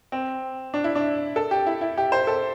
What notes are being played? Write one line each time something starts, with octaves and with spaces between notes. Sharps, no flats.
C4
D4
E4
D4
A4
G4
E4
E4
G4
C5
A4